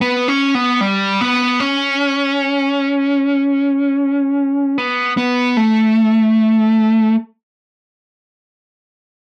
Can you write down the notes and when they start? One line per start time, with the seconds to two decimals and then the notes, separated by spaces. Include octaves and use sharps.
0.01 B3
0.28 C#4
0.55 B3
0.81 G3
1.21 B3
1.60 C#4
4.78 B3
5.17 B3
5.57 A3